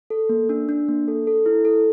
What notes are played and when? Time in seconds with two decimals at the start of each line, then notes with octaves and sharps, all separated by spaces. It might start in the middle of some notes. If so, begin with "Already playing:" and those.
0.10 A4
0.29 A#3
0.49 D4
0.69 D4
0.88 A#3
1.08 A4
1.27 A4
1.46 E4
1.65 A4